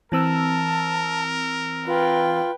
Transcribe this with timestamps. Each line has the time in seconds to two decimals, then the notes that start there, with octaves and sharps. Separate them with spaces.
0.12 E3 C4 A#4 A5 E6
1.86 F4 B4 G5